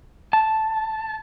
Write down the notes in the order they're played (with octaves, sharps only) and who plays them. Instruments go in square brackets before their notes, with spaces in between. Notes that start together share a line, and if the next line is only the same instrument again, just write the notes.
[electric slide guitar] A5